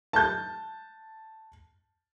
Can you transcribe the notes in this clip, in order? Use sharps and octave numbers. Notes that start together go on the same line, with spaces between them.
A5 G6